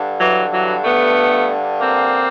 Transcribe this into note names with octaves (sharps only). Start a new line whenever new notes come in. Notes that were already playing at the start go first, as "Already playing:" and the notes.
Already playing: G2 D3
E3 F#3
E3 F#3
A3 B3
A#3 C4